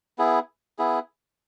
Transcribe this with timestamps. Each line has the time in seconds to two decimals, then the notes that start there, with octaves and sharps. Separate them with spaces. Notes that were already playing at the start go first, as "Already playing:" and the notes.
0.18 B3 E4 G#4
0.78 B3 E4 G#4